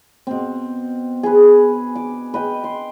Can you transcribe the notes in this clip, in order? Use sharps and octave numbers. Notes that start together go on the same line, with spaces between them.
B2 C4
G#4 B4
D6
B4 D#5 G5
C6